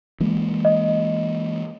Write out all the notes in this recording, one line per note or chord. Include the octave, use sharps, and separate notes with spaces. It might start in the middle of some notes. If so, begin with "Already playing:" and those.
E3 G#3 A#3
D#5